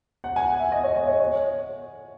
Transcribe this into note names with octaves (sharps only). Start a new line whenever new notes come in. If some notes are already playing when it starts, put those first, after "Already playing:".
F#5
G#5
F#5
E5
D#5
C#5
D#5
C#5
C#5